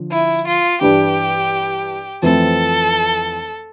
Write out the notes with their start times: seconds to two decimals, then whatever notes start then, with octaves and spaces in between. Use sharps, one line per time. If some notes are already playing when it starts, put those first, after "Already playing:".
Already playing: D3 F3
0.11 E4
0.46 F4
0.81 G2 E3 G3 D4 G4
2.22 F2 E3 A3 C4 A4